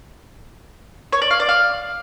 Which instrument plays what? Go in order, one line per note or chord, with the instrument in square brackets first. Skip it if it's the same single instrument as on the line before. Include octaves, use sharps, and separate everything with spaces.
[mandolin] C#5
D5
F5
D5
F5